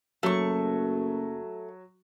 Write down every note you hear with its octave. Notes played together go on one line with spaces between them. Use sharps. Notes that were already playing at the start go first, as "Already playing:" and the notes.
F#1 F#3 A3 C#6